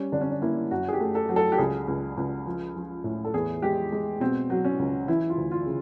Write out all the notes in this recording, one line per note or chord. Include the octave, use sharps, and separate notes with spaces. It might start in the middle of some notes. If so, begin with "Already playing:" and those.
Already playing: G3 C#4
D3 D4
C#4
D4
A#3 E4
F#2 F#4
G#4
G4
A3
A4
F#3
A4
G4
C#2 G#4
C#2
C#2
F3
F3
A2
A4
E2 G#4
G#3 G4
G#3
B2 C4
F#3
C#4
C#2
E3 E4
F4
D2
F4
C#3